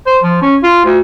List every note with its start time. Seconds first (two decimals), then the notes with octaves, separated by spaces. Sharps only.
0.06 C5
0.23 F3
0.42 C#4
0.63 F4
0.85 D2